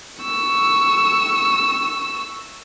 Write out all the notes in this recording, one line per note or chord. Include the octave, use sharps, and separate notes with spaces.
C#6 E6